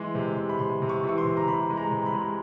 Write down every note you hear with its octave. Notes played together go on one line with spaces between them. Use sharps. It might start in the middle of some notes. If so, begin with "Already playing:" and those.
Already playing: E3 G#3 C6
C3
C3
B5
C3 C6
C3
C#6
E3
C#6
C6
C3
A#5
C3 B5
G#3
A#5
C3
B5
G#3